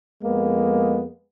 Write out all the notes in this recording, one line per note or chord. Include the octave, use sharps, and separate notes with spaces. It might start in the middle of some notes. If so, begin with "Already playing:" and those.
F2 G#3 A#3 B3